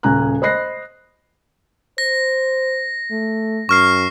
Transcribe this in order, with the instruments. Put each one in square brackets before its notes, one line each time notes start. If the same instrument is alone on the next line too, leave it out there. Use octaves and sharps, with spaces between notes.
[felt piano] D#1 C#3 G#5 A#5 F#6
C5 D#5 B5 F#6 A#6 C7
[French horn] C5 [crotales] A#6
[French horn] A3
[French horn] F#2 [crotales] C#6 F6 C7